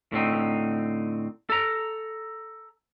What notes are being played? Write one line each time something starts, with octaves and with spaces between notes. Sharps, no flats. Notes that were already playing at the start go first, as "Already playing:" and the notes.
A2 D3 C4 D#4
A4 A#5